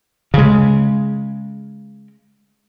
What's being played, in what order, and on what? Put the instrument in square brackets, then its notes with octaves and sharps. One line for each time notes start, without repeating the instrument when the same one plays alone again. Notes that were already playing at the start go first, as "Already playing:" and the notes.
[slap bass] C#3 G#3